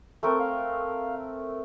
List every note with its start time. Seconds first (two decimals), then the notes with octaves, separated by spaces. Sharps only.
0.23 A3 C4 A#4
0.39 F5